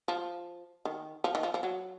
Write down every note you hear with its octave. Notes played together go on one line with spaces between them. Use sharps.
F3
D#3
F3
D#3
F3
F3
F#3